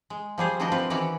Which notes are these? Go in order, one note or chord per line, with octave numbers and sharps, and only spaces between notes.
G#3
F3 G3 G#4 C5
D#3 F3 B3 D4 F#4 D#5
C4 F4 B4
D#3 E3 C#4 F#4 C#5 D5